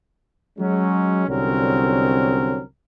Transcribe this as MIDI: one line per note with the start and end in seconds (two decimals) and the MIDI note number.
0.58 1.24 54
0.58 1.24 56
0.58 1.24 61
1.27 2.61 36
1.27 2.61 50
1.27 2.61 54
1.27 2.61 60
1.27 2.61 61
1.27 2.61 70